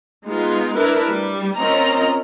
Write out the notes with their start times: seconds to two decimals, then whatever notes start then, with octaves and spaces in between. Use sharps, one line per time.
0.25 G#3 B3 D#4 F4 G#4
0.75 D4 E4 A#4 B4
1.07 G3
1.57 C4 C#4 F4 A#4 D#5 A#5